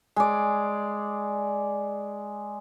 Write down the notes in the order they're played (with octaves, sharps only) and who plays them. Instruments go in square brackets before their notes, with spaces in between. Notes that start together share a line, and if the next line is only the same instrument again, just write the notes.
[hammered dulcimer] G#3 D5